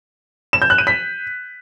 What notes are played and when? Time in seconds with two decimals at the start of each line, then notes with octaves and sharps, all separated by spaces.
0.53 E7
0.62 G6
0.70 F#6
0.78 D#7
0.87 B6